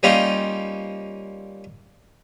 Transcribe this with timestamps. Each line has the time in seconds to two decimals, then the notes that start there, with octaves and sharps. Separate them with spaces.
0.03 G3 A#3 C#4 D#4 F4